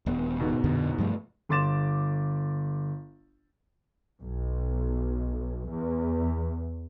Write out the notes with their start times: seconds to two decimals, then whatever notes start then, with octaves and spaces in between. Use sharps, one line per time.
0.06 D#1 B3
0.40 G#2 B2
0.64 F2 A#2 D3
0.98 G2 F3 A3
1.49 G1 C6 D6 A6 E7
4.20 B1
5.69 E2